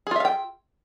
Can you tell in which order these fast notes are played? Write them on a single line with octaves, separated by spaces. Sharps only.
G#4 F4 E5 F5 G5